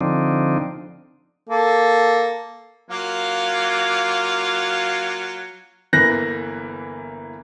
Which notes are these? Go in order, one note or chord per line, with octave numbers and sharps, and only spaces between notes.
D3 F3 C4 D4 D#4
A#3 A4
F#3 A#3 F4
G1 E3 A#3 F#6 A#6